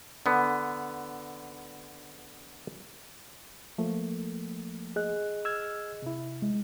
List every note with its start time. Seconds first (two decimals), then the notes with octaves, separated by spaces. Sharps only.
0.26 D3 B3
3.78 F3 A3 A#3
4.96 G#4 D#5 F#6
5.45 E6 F6 G#6
6.02 C3 E4
6.42 G#3